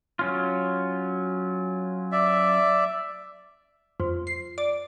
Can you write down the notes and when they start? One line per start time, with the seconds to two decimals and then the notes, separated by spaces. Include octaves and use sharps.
0.19 F#3 C#4 F4
2.12 D5 E5
4.00 F2
4.27 C7
4.58 D5